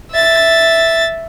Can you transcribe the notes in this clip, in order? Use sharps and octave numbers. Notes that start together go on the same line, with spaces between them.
E5 A6